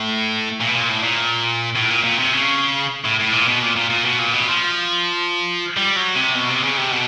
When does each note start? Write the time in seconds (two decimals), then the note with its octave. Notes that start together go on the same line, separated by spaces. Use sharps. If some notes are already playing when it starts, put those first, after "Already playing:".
Already playing: A2
0.61 A#2
0.68 B2
0.75 A#2
0.89 A2
1.04 A#2
1.75 A2
1.90 A#2
2.04 A#2
2.19 C3
2.33 C#3
3.04 A2
3.19 A2
3.33 A#2
3.48 B2
3.63 A#2
3.76 A#2
3.90 A#2
4.05 B2
4.19 A#2
4.33 B2
4.49 F3
5.77 G3
5.96 F#3
6.15 C3
6.34 B2
6.49 C3
6.63 C#3
6.77 C3
6.91 B2